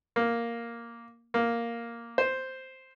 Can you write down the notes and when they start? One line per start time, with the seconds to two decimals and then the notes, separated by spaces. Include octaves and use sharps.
0.16 A#3
1.34 A#3
2.18 C5